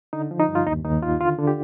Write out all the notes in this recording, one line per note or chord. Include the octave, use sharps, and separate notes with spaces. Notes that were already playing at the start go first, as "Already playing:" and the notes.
D3 D#4
F3
D#4
G2
F4
D#2 D#4
D#2 D#4
D#3 F4
D3 F4
D3
G4